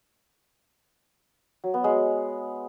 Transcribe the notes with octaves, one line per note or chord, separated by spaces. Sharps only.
F#3
B3
G#3